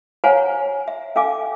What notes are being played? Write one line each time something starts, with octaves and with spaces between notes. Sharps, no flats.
C5 C#5 F5 F#5 G#5 A#5
E5
C#4 A4 E5 F5 G#5 D6